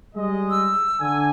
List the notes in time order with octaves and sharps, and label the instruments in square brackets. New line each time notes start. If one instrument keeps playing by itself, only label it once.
[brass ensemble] G3 G#3 D#5
[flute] E6
[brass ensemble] D3 G#5